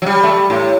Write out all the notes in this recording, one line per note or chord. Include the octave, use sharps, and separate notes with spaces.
F#3
G3
A3
G3
A2